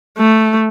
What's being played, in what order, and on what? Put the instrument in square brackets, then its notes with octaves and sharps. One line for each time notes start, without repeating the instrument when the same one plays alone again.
[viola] A3